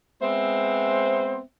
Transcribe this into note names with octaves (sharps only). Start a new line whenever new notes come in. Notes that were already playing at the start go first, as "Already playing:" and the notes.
G#3 B3 C4 C5 E5